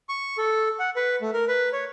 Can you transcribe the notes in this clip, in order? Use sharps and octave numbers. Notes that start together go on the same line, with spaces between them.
C#6
A4
F#5
B4
A3
A#4
B4
C#5